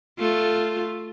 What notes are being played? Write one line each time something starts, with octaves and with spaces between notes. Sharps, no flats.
A3 F4